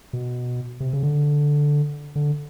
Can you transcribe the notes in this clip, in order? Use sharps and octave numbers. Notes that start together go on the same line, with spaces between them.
B2
C3
C#3
D3
D3